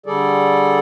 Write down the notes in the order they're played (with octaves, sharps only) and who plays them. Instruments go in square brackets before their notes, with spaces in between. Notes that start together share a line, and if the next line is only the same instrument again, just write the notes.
[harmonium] D3 G3 G#4 A4 D5